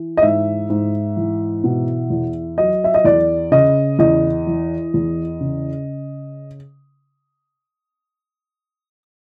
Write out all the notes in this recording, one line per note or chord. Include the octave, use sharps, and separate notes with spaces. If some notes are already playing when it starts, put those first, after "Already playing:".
Already playing: E3
D#5
G#2 E5
G#2
E3
B2
E2
F#3 D#5
E5
D#5
E2 D5
C#3 D#5
E2 D#5
E3
E2
C#3